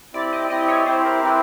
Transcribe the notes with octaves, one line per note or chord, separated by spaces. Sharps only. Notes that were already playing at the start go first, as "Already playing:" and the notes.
C4 E4 G4 D5
D#5
C4 E4 G4 D#5
C#5
C4 E4 G4 C5
A#4
C4 E4 G4 B4